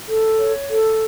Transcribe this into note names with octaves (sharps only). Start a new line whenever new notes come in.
A4
C#5
A4